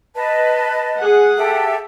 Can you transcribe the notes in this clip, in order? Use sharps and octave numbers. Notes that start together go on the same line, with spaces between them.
B4 D#5 A5
G#4 F#5
G4 A4 E5